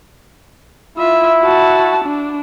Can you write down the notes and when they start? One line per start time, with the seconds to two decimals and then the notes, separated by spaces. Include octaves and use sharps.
0.98 E4 F4 E5
1.43 F#4 A5
2.05 D4